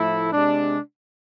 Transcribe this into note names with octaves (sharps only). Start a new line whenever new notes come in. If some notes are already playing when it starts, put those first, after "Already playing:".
Already playing: A2 F3 A3 E4
C3 G#3 D4